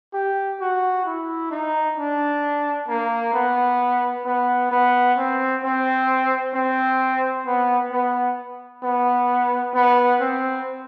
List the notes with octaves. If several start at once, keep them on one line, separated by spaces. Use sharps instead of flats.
G4
F#4
E4
D#4
D4
A#3
B3
B3
B3
C4
C4
C4
B3
B3
B3
B3
C4